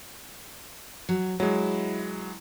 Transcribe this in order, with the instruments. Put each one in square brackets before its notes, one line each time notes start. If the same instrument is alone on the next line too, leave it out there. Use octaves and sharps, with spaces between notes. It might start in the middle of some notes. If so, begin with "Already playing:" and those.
[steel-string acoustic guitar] F#3
[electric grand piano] F#3 G#3 [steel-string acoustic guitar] E4